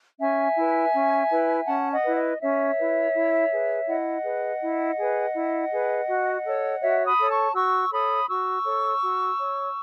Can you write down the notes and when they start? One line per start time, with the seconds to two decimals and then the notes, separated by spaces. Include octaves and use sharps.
0.20 C#4 E5 G#5
0.56 E4 B4
0.94 C#4
1.30 E4 B4
1.66 C#4 F#5 A5
1.91 D#5 F#5
2.04 E4 B4
2.16 D#5
2.41 C#4 C#5 E5
2.77 E4 B4
3.14 E4
3.50 G#4 B4
3.87 E4 D#5 F#5
4.24 G#4 B4
4.61 E4
4.97 G#4 B4
5.34 E4
5.70 G#4 B4
6.07 F#4
6.45 A4 C#5
6.81 F#4 C#5 E5
7.05 B5 D#6
7.19 A4 C#5
7.30 A5 C#6
7.55 F#4 C#6 E6
7.91 A4 C#5 B5 D#6
8.28 F#4 C#6 E6
8.65 A4 C#5
9.01 F#4
9.39 C#5